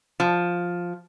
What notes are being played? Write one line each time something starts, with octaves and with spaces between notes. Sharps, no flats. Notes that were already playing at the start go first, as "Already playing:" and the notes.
F3